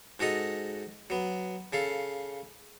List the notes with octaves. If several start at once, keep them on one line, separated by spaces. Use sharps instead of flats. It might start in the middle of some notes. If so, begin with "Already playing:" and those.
G#2 F#4 A4 D#5 A#5
F#3 B3
C#3 A4 F5